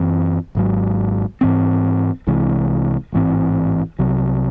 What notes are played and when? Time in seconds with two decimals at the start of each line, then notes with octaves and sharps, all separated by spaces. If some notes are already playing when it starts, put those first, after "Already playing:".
Already playing: F#2 E3 C4
0.55 G#1 G#2 F#3
1.41 G#2 E3 C4
2.27 C2 C3 E3 G#3
3.13 A1 G#2 E3 C4
3.99 C2 C3 F#3